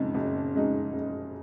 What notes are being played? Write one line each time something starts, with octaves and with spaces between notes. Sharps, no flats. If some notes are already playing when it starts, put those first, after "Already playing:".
Already playing: F#1 F2 C#3 G#3 D#4
F#1
F2 C#3 G#3 D#4
F#1